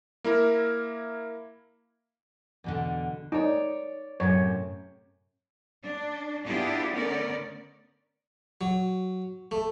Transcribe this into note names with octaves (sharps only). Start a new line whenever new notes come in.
A#3 E4 A#4
E2 B2 D3
D#4 C#5 D5
F#2 A2 C3 C#5
D4
B3 D4 E4 F4 G4 G#4
D3 A3 B3 C#4 A#4 D5
F#3
A3